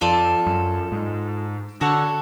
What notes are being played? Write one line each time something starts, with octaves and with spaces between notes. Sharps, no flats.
F2 F4 A4 D5
F#2
G#2
D3 F#4 A4 C#5 F#5